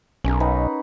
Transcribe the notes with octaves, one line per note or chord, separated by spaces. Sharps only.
B1 C#4 A#4
D#4 B4 F#5